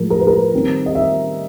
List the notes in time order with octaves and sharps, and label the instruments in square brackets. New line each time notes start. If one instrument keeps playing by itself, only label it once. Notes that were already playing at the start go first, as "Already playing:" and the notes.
Already playing: [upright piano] A2 F3 G#3 A#4
A#4
B4
A#4
D#3 G3 C4
D#5
E5